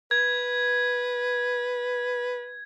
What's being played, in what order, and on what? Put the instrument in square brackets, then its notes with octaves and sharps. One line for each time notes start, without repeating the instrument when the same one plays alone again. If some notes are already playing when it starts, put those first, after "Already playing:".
[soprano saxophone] B4 [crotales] G#6